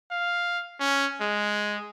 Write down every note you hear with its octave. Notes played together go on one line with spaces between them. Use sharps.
F5
C#4
G#3